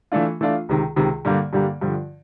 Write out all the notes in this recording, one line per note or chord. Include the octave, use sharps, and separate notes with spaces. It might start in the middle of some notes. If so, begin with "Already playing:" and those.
E3 A3 D4 F4
E3 A3 D4 F4
C#2 C3 D#3
C#2 C3 D#3
G2 D3 G3 A#3
G2 D3 G3 A#3
G2 D3 F3